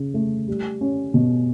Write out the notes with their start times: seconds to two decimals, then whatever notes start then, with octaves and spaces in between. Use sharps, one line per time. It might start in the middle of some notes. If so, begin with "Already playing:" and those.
Already playing: C#3
0.14 A3
0.47 G3
0.81 C#4
1.14 B2